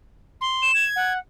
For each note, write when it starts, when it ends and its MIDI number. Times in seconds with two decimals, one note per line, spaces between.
0.41 0.72 84
0.62 0.85 100
0.75 1.13 92
0.96 1.18 78